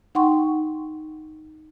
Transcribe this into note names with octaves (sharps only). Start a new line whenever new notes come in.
D#4 F#5 G5 C6 C#6